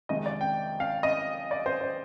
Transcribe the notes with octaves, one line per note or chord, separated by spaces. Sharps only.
F2 C3 D#3 G#3 D#5
D5
G5
F5
D#5
D5
C5
C5